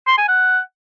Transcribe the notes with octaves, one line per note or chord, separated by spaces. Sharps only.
C6
G#5
F#5